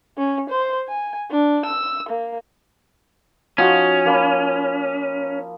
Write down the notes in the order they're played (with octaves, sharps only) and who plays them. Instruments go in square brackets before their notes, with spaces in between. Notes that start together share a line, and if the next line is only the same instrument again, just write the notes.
[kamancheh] C#4
C5
G#5
D4
E6
A#3
[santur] F3 D#4 F#4 [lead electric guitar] C#4
[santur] F3 A#3 B5